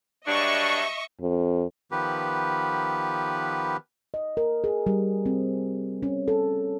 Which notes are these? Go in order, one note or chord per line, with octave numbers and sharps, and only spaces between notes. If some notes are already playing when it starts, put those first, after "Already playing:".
G2 F#3 D4 D#5 E5 C#6
F2
D#3 F3 B3 G4 B4
D#5
A#4
G#4
G3
C4
C#4
A4